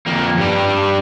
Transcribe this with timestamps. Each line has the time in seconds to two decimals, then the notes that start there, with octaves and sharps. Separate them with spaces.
0.06 F2 A#3
0.37 G2 G3